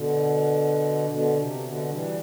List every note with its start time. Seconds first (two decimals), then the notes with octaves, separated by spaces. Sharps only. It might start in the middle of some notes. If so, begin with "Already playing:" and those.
Already playing: B2 D3
1.10 B2 D3
1.36 C3
1.63 B2 D3
1.89 E3 G3